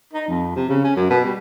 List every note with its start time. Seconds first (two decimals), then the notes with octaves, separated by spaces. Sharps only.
0.13 D#4
0.28 F2
0.56 C3
0.69 C#3
0.84 C#4
0.96 F#2
1.10 B2
1.24 G3